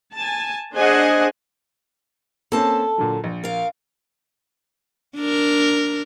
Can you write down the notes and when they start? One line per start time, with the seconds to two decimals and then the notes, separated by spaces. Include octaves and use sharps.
0.14 G#5 A5
0.75 D4 G#4 C5 D#5 F#5 G#5
2.52 A#3 C4 C#4 A4 A5
2.98 A#2 D3 F#3
3.24 A#1
3.44 A#4 F5
5.16 D4 A#4